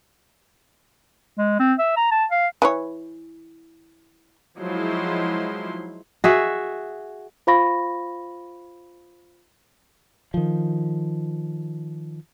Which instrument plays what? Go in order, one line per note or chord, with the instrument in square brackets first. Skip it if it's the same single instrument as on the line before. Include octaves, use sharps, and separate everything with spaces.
[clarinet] G#3
C4
E5
A#5
A5
F5
[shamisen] E3 B4 C#5
[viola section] F3 F#3 G#3 D#4 E4 C6
[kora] F#4 G#4 E5
[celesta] F4 C5 F5 B5 C#6 A#6
[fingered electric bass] D#3 F3